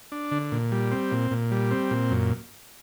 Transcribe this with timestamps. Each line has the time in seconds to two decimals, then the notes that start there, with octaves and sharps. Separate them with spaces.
0.12 D4
0.31 D3
0.52 A#2
0.72 G3
0.92 C4
1.11 A#2
1.31 A#2
1.51 G3
1.71 C4
1.91 A#2
2.11 F#2